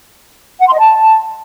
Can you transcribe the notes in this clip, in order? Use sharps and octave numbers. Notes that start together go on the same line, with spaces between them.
F#5
C6
D#5
A5